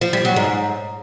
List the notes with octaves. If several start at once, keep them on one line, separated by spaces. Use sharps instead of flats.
F3
G3
F#3
G#2